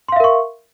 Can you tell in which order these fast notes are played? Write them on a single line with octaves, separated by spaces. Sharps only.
C6 F5 E5 A#4 C#6